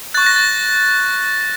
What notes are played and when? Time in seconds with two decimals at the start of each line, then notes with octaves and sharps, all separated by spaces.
0.14 C#6 F#6 A6
0.26 A#6
0.36 A6